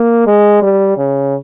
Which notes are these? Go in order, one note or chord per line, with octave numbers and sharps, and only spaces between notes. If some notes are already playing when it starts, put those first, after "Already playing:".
Already playing: A#3
G#3
G3
C#3